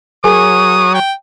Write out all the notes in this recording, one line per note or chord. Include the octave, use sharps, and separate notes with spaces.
F#3 G#4 A#4 C#5 G#5 D#6
G5